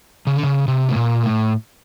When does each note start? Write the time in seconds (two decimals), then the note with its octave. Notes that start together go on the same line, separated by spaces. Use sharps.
0.27 C#3
0.35 D3
0.43 C#3
0.68 C3
0.89 A2
0.96 A#2
1.23 A2